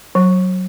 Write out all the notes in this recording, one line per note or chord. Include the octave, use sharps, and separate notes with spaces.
F#3